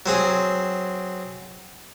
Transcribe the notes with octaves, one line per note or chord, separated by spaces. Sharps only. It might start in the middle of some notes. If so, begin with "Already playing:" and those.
F#3 C4 G#4